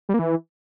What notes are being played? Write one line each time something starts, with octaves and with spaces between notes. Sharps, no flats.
G3
A#3
E3